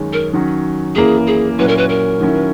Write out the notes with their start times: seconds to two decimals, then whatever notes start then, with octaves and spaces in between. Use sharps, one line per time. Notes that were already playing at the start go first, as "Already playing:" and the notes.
Already playing: F#2 D#3 G#3 C#4
0.13 A#4
0.33 D#3 F#3 C#4
0.95 F#2 E3 A#3 E4 G#4
1.27 G#4
1.58 A#2 F#3 C#4 E4 B4
1.68 A#4
1.78 B4
1.89 A#4
2.20 D#3 F#3 C#4 E4